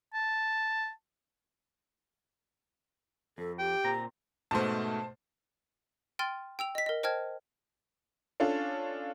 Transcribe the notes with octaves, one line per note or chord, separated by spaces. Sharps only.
A5
F2 A4
G4 G5
A#2 C4 A#5
G#2 B2 A3 C5 A5
G5 C6 F6 A6 D#7
G5 E6 F7
D#5 B6
A#4 D#5
C5 D#5 G5 A5 F6 G#6
C#4 D4 F4 A4